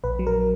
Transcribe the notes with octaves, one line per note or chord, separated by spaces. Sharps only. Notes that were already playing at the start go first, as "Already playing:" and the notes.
A#1 B4
F#3
A#4